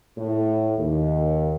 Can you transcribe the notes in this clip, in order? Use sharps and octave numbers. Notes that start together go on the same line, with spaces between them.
A2
D#2